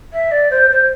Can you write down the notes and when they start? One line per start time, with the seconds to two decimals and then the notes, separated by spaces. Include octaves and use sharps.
0.13 E5
0.31 D5
0.50 C5
0.70 C5